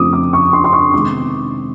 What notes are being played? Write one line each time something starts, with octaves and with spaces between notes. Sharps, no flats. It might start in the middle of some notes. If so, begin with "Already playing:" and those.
Already playing: F2 C#3 F3 A3 C4 D6 D#6
D6
C#6
C6
C6
C#6
C3 D#3 G#3 B3 D6